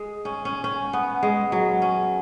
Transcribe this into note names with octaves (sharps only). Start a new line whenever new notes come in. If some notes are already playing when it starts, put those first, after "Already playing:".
Already playing: G#3
C#4
C#4
C#4
B3
G#3
F#3
C#4